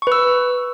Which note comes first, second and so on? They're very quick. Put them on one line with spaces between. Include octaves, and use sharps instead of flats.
C#6 B4 E6